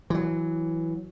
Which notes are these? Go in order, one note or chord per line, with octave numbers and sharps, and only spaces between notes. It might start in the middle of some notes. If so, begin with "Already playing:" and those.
E3 F#3